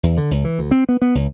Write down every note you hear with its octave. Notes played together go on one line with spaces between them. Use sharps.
E2
D3
C#2
E3
D2
C4
B3
B3
C#2